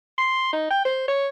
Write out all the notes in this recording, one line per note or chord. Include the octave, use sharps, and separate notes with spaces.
C6
D#4
G5
C5
C#5